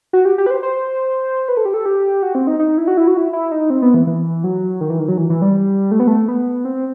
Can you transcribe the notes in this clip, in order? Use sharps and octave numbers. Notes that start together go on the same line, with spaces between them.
F#4
G4
G4
B4
C5
C5
B4
A4
G4
A4
G4
F#4
C4
D#4
D#4
E4
F#4
E4
F#4
E4
E4
D#4
C4
B3
E3
E3
F#3
D#3
E3
D#3
F#3
E3
E3
G3
A3
B3
A3
B3
C4